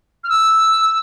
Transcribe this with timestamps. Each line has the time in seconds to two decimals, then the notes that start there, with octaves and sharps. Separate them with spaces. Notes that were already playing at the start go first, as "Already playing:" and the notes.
0.24 F6
0.29 E6